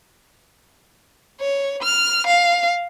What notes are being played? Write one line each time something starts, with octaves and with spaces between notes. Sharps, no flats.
C#5
F6
F5